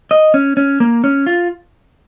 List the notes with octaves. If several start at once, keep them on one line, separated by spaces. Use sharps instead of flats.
D#5
C#4
C#4
A#3
C#4
F4